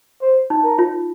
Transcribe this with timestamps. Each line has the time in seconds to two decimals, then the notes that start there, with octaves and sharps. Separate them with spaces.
0.22 C5
0.50 D#4
0.64 A#4
0.79 F4